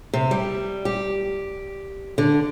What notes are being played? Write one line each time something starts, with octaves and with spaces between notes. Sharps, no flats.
C3
G3
G4
D3